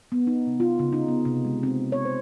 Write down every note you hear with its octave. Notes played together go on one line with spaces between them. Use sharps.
B3
D#4
C3
F4
C#3
D#4
B3
C3
G#3
C4
C#5
C5